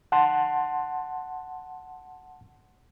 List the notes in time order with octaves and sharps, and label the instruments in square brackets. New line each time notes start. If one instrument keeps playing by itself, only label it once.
[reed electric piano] F#5 A5 C6